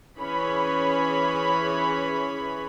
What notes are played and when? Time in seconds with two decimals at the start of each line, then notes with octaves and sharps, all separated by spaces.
0.19 E3 C#4 G#4 C#5 B5